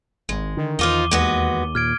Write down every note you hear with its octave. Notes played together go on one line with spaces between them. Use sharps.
G#1 G#3
D3 D#3
E2 D#4 F4 C5 D6 D#7 G7
D#2 G#3 B3 F#4
A#2 F6 G#6 D7